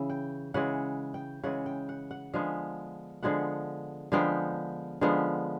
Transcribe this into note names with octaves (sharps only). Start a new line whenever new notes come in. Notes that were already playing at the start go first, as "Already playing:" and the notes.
Already playing: C#3 E3
G5
C#3 E3 G#3 F#5
G5
C#3 E3 G#3 F#5
G5
F#5
F#5
D3 F3 G#3 B3
D3 F3 G#3 B3 F#5
D3 F3 G#3 B3 G5
D3 F3 G#3 B3